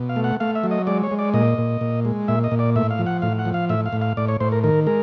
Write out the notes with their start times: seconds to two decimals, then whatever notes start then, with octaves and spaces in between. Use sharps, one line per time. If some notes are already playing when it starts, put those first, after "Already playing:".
Already playing: B2
0.09 F5
0.16 A3
0.24 F#5
0.40 A3 F5
0.55 E5
0.64 F#3
0.71 D#5
0.87 G#3 D5
1.03 C#5
1.11 G#3
1.19 D5
1.34 A#2 D#5
1.58 A#2
1.81 A#2
2.05 G#3
2.28 A#2 E5
2.44 D#5
2.52 A#2
2.59 D5
2.76 A2 E5
2.90 F5
2.99 F3
3.06 F#5
3.22 A2 F5
3.39 F#5
3.45 F3
3.54 F5
3.69 A2 E5
3.86 F5
3.93 A2
4.02 F5
4.17 A2 D5
4.28 C#5
4.40 A2 C5
4.52 A#4
4.63 D#3 A#4
4.87 G#3 A#4